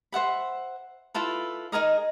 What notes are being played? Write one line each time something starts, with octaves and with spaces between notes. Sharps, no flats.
C5 E5 F#5 B5
E4 F4 A4 B4
D#4 G#4 A#4 D#5